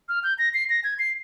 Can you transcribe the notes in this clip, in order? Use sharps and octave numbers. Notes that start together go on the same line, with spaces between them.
F6
G6
A#6
C7
A#6
G#6
C7